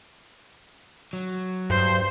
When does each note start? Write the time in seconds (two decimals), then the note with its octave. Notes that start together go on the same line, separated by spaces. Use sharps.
1.13 F#3
1.70 G2 C5